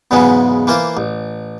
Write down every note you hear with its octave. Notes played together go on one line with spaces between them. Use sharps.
E2 G#2 C#3 F#3 G#3 B3
E3 A#3 F4 C5 D6
A1